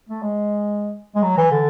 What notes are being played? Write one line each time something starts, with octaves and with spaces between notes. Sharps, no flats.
A3
G#3
G#3
F#3
E3
D3